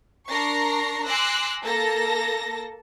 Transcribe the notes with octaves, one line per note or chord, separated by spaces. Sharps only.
D4 A#4 A#5 C#6 A#6 C7
G#5 C6 D6 E6 F#6 A#6
A#3 A4 A5 A#6